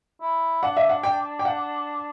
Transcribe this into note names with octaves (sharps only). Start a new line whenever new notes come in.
E4
D4 F#5
E5
F#5
G5
G5
F#5